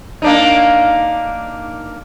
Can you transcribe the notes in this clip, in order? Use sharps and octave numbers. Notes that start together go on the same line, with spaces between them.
A#3 D4 D#4